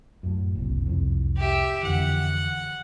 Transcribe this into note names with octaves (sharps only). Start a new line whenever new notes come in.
F#2 A2
F#1 C2
C2 F2
G4 E5
F2 D3 E3 F#5